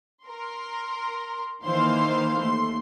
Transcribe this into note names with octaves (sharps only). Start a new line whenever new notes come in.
A#4 C6
D#3 E3 A#3 C5 F5 C6
D#2 A3 C6